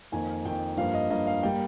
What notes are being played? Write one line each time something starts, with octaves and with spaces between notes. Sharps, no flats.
F2 D#3 A#3 G#5
F2 D#3 A#3 G5
G2 F3 A#3 F5
D#5
G2 F3 A#3 D#5
F5
G3 A#3 G5